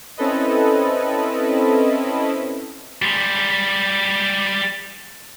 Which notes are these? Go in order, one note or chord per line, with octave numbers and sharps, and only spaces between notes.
C4 C#4 E4 A4 B4 D#5
G3 G#3